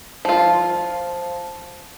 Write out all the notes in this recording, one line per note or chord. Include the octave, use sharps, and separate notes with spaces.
F3 F4